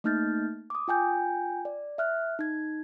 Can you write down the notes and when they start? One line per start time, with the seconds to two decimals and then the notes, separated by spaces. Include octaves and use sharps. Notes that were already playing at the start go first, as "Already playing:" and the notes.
0.04 A3 A#3 D#4 F6 G6 A6
0.70 D6 D#6
0.88 F4 G5 G#5 G6
1.65 D5
1.98 E5 F6 F#6
2.39 D#4 G#6